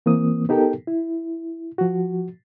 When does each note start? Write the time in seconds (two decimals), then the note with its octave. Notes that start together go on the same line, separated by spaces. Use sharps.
0.06 E3 A#3 C4 D#6
0.49 B3 D#4 G4 A4 A#4 G5
0.87 E4
1.78 F3 F#4